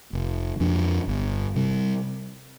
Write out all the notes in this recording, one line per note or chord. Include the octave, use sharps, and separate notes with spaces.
F1
F2 F3 D4
G1
C3 G3